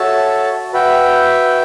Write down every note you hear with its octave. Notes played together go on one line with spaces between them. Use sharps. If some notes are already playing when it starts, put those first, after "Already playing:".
Already playing: F#4 A4 C#5 E5 A5
F#4 B4 E5 G5